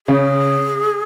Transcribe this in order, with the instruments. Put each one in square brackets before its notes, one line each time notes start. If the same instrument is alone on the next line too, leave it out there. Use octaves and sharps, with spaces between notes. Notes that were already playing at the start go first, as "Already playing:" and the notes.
[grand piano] C#3 [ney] G#4